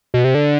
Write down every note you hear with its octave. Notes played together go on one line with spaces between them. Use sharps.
B2
C3
D3